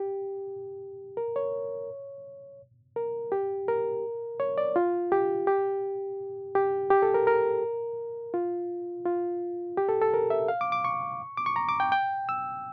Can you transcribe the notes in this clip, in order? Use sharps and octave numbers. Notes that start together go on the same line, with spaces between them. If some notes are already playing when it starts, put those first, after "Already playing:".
Already playing: G4
A#4
C#5
A#4
G4
A#4
C#5
D5
F4
G4
G4
G4
G4
A4
A#4
A#4
F4
F4
G4
A4
A4
A#4
E5
F5
D6
D6
C#6
D6
C#6
A#5
D6
G5
G5
E6